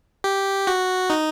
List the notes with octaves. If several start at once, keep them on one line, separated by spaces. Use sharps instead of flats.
G4
F#4
D#4